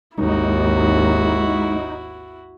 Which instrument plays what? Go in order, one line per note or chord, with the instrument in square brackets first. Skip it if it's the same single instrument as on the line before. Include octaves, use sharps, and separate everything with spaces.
[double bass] G#1 D#2 [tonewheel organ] G#3 [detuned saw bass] D#4 [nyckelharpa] E4 F#4